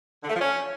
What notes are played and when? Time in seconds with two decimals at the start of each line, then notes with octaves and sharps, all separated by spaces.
0.23 D3
0.29 A3
0.35 F3
0.41 C#4